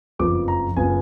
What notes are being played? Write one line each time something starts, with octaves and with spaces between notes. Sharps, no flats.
F#1 F2 F3 B3 D6
A#5
F#1 F3 B3 G#5